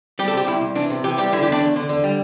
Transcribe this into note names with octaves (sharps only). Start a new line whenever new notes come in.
G3 G4
A4
C3 G4
C2 E4
C2
E3 D4
C3
E3 G4
G3 G4
D3 E4
G4
E2
D4
E2
D3
D3
G3